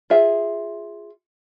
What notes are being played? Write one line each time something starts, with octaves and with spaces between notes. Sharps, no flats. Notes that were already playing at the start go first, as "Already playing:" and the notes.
F4 G#4 E5